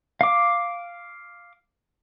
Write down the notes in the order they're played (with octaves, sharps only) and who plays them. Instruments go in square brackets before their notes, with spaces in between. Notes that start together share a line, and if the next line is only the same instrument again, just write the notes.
[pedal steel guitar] F5 D6